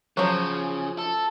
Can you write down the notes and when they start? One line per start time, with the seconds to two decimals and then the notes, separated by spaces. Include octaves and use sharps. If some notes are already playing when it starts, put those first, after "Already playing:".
0.17 C#3 F3 F#3
0.98 A4